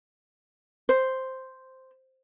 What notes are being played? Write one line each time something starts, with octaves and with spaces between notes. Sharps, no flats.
C5